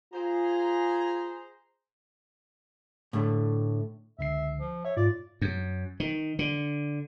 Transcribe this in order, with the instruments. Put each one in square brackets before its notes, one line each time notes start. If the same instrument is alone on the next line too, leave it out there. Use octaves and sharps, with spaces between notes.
[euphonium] F4 [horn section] G#4 C5 A#5
[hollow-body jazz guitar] A2 D3 A3
[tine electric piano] C#2 D3 C7 [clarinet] E5
[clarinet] F3
[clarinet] C#5 [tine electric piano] E5
[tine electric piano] G#2 F4 [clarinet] D5
[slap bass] F#2
D#3
D3